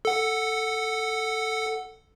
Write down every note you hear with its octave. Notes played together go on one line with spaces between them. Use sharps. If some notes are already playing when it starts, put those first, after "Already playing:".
A4 F#5